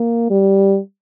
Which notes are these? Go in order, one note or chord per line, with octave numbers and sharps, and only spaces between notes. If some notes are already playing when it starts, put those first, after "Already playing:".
Already playing: A#3
G3